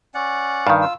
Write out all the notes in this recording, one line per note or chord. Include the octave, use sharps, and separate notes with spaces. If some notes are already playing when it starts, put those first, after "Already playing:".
C#4 D5 F#5
G2 D#3 F5
F4 E6